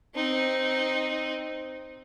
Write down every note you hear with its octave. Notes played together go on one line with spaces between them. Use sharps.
C4 D#4